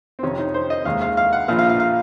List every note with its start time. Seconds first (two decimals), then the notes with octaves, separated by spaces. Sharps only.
0.19 C4
0.23 F2 C3 D#3 C#4
0.39 D#4
0.54 C5
0.70 D#5
0.85 D#2 D#3 G#3 F5
1.01 F5
1.17 F5
1.33 F#5
1.48 A#1 A#2 F3 F5
1.59 F5
1.69 F5
1.80 F5